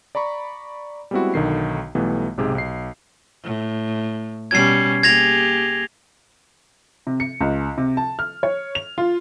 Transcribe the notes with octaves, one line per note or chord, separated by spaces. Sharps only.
D5 A#5 B5 C#6
G3 G#3 B3 C4 E4 F#4
B1 D3 D#3 C7
B1 E3 G3 A3 B3
B1 G#2 C3 G4 G#4
B1 C7
A2
B2 G3 C#4 G#6 C7
A#3 G4 G#4 G#6 A#6 F7
C3
C#7
C#2
C3
A5
F6
C#5
F7
F4